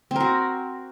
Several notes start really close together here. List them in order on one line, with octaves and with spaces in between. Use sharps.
C4 A#4 F#4